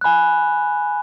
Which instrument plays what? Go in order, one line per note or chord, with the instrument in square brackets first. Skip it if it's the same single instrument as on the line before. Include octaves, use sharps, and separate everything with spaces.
[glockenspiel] G#5 B5 F#6